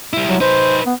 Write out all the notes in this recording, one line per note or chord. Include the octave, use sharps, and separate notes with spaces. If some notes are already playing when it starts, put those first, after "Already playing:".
G3 E4
F#3
D#4 B4 C5
B3